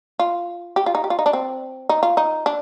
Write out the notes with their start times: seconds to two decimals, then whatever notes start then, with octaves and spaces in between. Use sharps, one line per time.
0.19 F4
0.76 G4
0.86 F4
0.95 D#4
1.04 G4
1.10 F4
1.19 D#4
1.26 D4
1.33 C4
1.89 D#4
2.03 F4
2.17 D#4
2.46 D4